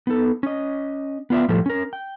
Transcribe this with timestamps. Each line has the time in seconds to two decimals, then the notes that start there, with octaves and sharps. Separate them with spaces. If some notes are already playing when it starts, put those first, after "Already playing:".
0.07 B3 D#4 A4
0.43 C#4 D#5
1.30 B3 F4 D5 E5
1.49 A2 F3 G3 A4
1.66 C#4 A#4
1.93 G5